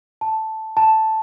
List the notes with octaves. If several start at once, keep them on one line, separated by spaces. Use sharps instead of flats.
A5
A5